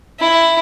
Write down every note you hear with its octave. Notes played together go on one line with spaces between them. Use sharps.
E4